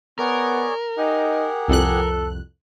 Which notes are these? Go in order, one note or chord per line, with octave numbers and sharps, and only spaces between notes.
B3 G#4 A#4 C#5 D5
D#4 G4 G#4 F#5
C2 F2 A4 F#6